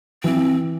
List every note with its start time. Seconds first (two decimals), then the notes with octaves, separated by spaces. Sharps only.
0.24 E3 C4